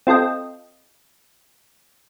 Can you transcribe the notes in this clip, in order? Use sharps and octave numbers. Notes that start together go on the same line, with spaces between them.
C4 F4 A4 D#5 G5